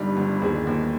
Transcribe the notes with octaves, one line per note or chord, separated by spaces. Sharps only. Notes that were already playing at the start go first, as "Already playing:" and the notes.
Already playing: G1 G2 D#3 G3
G1
D#2 G#4
D#2